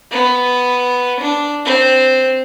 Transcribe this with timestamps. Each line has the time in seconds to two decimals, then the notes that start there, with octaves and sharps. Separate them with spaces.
0.12 B3
1.20 D4
1.65 C4